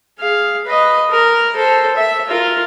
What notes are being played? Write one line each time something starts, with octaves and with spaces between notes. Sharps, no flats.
G#4 F5
B4 D#5
A#4
A4 C5
E5
F4 A#4